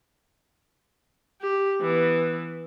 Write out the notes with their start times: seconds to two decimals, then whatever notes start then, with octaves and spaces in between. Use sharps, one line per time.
1.41 G4
1.81 E3 B3